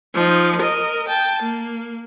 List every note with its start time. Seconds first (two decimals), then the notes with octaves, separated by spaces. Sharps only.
0.14 F3 D#4
0.58 A#4 D#5
1.08 G5 A5
1.42 A#3